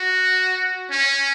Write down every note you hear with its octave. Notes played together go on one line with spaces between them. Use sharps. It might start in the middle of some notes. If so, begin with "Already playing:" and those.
Already playing: F#4
C#4